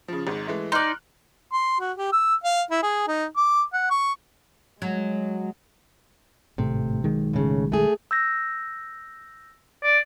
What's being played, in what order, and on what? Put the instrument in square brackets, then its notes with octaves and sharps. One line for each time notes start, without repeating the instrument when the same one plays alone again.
[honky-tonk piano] C#3 F3
G#1 G#2
E3 G#3 A3
[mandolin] D#4 D5 [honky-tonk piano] C6 F6 F#6
[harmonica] C6
F#4
G4
E6
F5
E4
G#4
D#4
D6
F#5
C#6
[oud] F#3 [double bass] G#3
[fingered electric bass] G#1 A2 A3 [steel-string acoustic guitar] C3
[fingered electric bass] B1 D#3 G#3
[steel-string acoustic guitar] A2 C#3
A3 G#4
[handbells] E6 G6 A#6
[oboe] D5